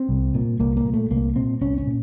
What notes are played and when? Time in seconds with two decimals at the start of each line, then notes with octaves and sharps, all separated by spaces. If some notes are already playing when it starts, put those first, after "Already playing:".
Already playing: C4
0.09 C2
0.34 A#2
0.59 C2 A#3
0.77 A#3
0.85 A#2
0.94 A3
1.10 C2 A#3
1.35 A#2 C4
1.61 C2 C#4
1.78 C#4
1.87 A#2